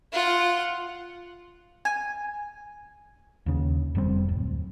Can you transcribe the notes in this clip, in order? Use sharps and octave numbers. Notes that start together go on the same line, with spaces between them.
F4 F#5
G#5
D#2 C#3
F1 G3 C4
D1